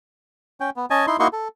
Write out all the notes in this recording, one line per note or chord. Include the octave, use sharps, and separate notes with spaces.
C#4 G5
B3
C#4 D#5 G#5 A5
D#4 E4 C6
A#3 D#4 E4 F#4 C6 C#6
A4